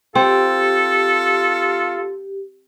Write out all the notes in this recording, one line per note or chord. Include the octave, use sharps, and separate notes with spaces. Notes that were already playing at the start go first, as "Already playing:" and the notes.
C4 F4 G4 A4